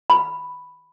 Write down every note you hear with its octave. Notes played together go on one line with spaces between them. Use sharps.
B5